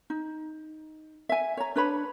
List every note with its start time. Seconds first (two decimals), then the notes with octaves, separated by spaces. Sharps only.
0.10 D#4
1.29 E5 G#5
1.57 C#5 A#5
1.76 D4 B4 C#5 B5